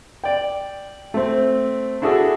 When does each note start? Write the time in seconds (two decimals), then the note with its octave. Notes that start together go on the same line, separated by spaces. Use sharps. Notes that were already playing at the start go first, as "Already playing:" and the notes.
0.24 D5 G5
1.14 A3 C4
2.02 D4 E4 F#4 G#4 A4